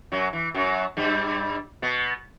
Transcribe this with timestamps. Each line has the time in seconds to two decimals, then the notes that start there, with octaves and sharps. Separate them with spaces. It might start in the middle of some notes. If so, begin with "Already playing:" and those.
0.12 F#2 F#3
0.33 E3
0.54 F#2 F#3
0.97 G2 G3
1.82 B2 B3